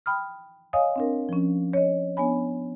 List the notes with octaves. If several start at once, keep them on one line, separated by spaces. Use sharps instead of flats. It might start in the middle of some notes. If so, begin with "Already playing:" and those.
G5 B5 D#6 F6
C#5 D#5 F5 G#5 D#6
C4 D4 A#4
F3 C#4
C#5 D#5
B3 D4 C#5 G#5 B5